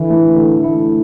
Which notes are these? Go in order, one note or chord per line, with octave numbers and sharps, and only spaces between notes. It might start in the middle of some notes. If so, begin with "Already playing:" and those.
Already playing: D3 E3
A3 E4
D3
A3 E4